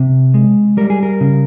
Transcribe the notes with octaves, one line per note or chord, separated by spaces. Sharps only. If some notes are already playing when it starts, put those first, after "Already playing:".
Already playing: C3
G#3
G3 A#4
G#4
A#4
C#3